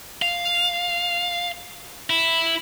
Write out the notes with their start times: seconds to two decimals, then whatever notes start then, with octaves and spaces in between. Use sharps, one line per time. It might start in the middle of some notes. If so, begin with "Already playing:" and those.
0.22 F5
2.10 E4